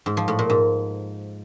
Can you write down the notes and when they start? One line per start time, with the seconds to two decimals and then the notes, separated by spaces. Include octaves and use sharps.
0.06 G#2
0.17 F3
0.28 A2
0.39 A#2
0.50 G#2